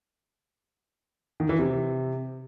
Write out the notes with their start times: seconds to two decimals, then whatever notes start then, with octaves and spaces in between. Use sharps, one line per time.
1.40 D#3
1.49 E3
1.59 C3